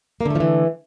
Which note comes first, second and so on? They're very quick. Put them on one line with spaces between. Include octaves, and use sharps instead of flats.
A#3 D3 A3 F3 E3